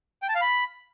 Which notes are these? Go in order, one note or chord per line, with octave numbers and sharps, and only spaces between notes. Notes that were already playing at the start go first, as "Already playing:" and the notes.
G5
A5
F5
B5